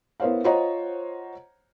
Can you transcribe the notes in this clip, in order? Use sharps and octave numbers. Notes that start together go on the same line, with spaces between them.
B3 E4 A#4 C5 C#5 F5
F4 C5 C#5 D#5 F#5 A#5